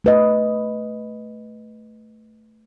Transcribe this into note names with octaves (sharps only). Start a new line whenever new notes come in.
A3 B4 D#5